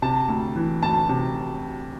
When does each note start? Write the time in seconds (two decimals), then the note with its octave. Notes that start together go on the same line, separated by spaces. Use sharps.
0.02 C3 A5
0.28 D2
0.56 E3
0.82 D2 A5
1.09 C3